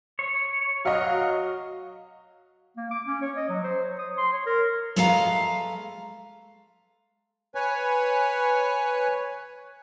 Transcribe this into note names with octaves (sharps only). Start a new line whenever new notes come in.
C#5
F#3 D#5 F5
A#3
D6
C#4
C#5
D#5
F#3
C5
C#5
D#6
C6
C#5
A#4
G#3 A3 A4 B4 F5 A#5
B4 C#5 G#5